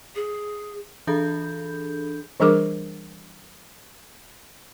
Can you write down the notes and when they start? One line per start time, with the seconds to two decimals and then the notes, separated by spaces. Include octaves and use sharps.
0.16 G#4
1.07 E3 D4 G#4 A4 B5 G6
2.40 E3 G3 D4 G#4 A#4 D6